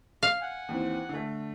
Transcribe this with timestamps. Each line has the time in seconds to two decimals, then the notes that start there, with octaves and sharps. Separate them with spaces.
0.23 F5
0.41 F#5 G#5
0.68 D#2 E3 C4
1.09 D3 A3